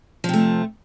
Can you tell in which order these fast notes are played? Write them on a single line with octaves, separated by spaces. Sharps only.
F3 C3 A3